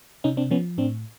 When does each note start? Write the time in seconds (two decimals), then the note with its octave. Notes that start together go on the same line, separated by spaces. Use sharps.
0.24 C3 C#4 D#4
0.37 C4 D4
0.51 F3 B3 C#4
0.78 A2 C4 D4